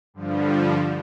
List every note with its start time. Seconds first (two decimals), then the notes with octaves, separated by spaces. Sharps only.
0.14 G2 D3 F3 G3